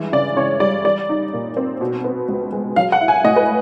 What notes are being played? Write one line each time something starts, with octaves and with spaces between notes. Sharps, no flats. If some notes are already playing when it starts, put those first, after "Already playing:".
Already playing: G2 E3 G#3
C#3 D5
C#3 C#5
G3 D5
G3 D5
D#4
A#2
C4
B2
B3
C#2
G#3
F#3 F5
F#5
E4
G#5
A2 D#5
B4